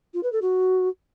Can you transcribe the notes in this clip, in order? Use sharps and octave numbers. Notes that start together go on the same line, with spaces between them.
F4
B4
A4
F#4